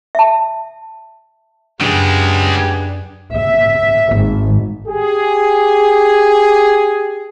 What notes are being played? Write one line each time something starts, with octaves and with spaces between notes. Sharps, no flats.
E5 A5
F#2 C#3 G#3 B3 D4 G4 G#4
E5
G#1
G4 G#4